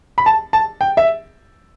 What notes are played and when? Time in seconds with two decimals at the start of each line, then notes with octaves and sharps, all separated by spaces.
0.18 B5
0.26 A5
0.53 A5
0.81 G5
0.97 E5